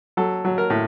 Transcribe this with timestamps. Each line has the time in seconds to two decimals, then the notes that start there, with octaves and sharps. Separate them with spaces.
0.17 F#3 A4
0.45 F#3
0.58 A#4
0.70 A2